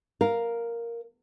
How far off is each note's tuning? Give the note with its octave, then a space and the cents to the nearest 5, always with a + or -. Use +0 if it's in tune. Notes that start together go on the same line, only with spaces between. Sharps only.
A#4 +0 F5 +0